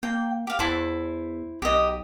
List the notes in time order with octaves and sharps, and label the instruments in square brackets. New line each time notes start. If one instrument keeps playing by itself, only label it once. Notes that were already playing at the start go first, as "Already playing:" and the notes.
[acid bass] A#3 [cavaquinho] G5
[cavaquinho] G4 F5
[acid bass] E2 [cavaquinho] E4 C5 A5
[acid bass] B1 [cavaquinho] G4 D#5